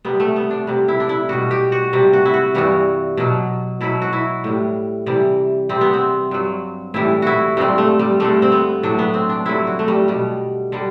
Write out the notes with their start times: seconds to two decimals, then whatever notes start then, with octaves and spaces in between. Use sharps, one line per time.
0.05 C3 G3 B3
0.20 A3
0.36 B3
0.50 D4
0.67 C3 G3
0.88 E4
1.00 D4
1.09 E4
1.29 B2 G3 F#4
1.51 G4
1.72 F#4
1.93 C3 G3
2.13 F#4
2.25 E4
2.34 F#4
2.55 G2 E3 G3 F#4
3.17 B2 F#3
3.81 B2 F#3 E4
4.02 F#4
4.13 E4
4.44 A2 G3
5.06 C3 E3 G3
5.69 C3 G3 C4
5.81 B3
5.94 C4
6.31 G2 F#3
6.94 A2 E3 G3 E4
7.22 E4 F#4
7.57 G2 D3 G3 C4
7.78 A3
7.99 G3
8.20 G2 D3 G3 A3
8.42 C4
8.52 B3
8.83 A2 F#3 D4
8.99 B3
9.14 C4
9.29 D4
9.46 G2 D3 F#3 E4
9.67 F#4
9.79 A3
9.88 G3
10.08 B2 G3
10.72 D3 G3